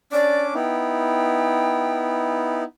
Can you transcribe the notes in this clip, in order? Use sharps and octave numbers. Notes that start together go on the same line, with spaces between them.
C#4 D4 D5 D6
B3 D#4 E4 G5